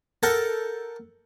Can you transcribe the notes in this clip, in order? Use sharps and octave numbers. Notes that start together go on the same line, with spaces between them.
A4 A#4 F#5 G5